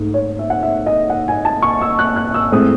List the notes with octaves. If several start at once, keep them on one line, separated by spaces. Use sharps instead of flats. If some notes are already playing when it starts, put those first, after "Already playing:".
Already playing: G#2 A3
C#5
E5
F#5
E5
D#5
F#5
G#5
A5
C#6
E6
F#6
F#6
E6
A2 G#3 C4 D#6